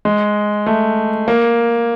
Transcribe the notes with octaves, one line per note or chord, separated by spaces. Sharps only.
G#3
A3
A#3